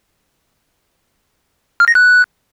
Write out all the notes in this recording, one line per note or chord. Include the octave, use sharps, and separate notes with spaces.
F6
A#6
F#6